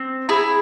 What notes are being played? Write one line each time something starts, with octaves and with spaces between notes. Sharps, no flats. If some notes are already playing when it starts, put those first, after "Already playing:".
Already playing: C4
E4 G#4